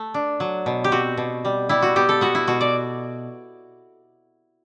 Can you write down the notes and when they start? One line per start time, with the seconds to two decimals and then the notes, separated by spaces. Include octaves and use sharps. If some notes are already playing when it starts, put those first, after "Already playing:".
Already playing: A3
0.14 D4
0.40 F#3
0.66 B2
0.84 G4
0.92 C4 F#4
1.17 B2
1.45 G3
1.69 G3 E4
1.82 F#4
1.96 B3 G4
2.09 A4
2.21 B3 F#4
2.35 E4
2.47 B2 F#4
2.61 D5